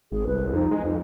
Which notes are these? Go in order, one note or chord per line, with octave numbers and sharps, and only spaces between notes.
G#1 G#4
C2 B4
F2 D#4
G#3
F2 D#4